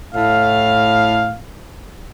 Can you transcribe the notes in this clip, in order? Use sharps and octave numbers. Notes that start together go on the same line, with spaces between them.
A2 F5